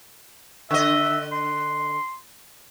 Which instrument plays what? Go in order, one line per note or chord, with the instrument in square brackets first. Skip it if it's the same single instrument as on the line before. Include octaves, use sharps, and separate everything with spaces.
[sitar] D3 D#5 [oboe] E5
[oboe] C6